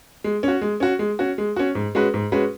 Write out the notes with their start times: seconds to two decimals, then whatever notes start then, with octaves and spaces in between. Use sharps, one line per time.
0.24 G#3
0.43 C#4 F#4
0.62 G#3
0.80 C#4 F#4
0.99 G#3
1.19 C#4 F#4
1.38 G#3
1.56 C#4 F#4
1.75 G#2
1.95 G#3 C#4 F#4 B4
2.14 G#2
2.32 G#3 C#4 F#4 B4